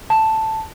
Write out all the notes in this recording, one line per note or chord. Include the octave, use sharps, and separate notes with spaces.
A5